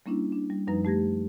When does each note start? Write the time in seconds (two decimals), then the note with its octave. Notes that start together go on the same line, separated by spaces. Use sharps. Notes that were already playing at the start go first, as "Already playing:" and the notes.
0.06 G3 A#3 C#4 D4 E4
0.32 D4
0.50 G3
0.67 F#2 F3 G3 D#4 B4 A#5
0.85 A3 G4 G#6 A#6